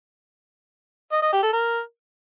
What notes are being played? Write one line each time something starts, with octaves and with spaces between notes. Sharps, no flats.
D#5
D#5
G4
A4
A#4